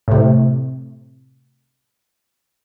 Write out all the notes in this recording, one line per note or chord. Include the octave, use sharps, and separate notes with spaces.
A2 C3